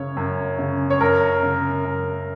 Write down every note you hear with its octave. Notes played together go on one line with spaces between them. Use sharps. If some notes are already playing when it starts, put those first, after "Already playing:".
Already playing: F#2 C#3 C#5
F#2
C#3
C#5
F#2 A#4
C#3
F#2